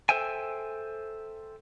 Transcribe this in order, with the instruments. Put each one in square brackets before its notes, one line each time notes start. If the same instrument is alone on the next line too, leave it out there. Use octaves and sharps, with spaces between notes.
[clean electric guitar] A4 C5 E5 G5 G#5